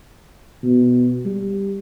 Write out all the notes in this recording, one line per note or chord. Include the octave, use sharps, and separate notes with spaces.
B2
G3